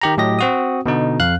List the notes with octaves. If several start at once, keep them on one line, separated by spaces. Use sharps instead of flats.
D#3 G4 A#5
A2 F#3 G4 D#5 A#6
C4 F#4 D#6
B2 D3 D#4
F2 F5 F#6